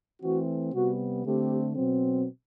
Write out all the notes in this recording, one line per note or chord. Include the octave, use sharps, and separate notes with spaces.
E3 A3 C4 F#4
C3 G3 B3 F#4
D3 A3 C4 G4
B2 F#3 C4